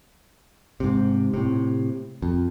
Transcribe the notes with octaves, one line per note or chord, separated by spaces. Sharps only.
G#2 C3
A2 C3
F2